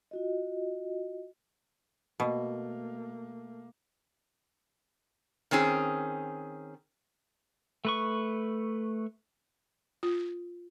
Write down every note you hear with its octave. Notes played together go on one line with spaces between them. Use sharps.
F4 F#4 D#5
B2 A3 A#3
D#3 C4 C#4 G#4
A3 B4 C#6
F4